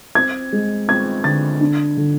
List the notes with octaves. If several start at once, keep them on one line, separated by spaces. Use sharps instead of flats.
C4 G#6
G#3
C4 G#6
D3 A6
D4
D3